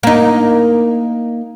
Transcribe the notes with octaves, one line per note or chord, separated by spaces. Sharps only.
A#3 D#4